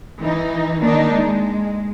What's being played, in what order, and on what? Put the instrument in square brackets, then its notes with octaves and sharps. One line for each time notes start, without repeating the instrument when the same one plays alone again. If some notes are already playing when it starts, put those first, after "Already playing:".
[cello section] E3 D#4
[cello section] D#3 D4 D#4 [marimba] A#3
[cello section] G#3